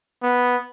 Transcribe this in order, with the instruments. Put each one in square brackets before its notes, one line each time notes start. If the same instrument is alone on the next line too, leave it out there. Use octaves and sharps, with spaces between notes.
[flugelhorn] B3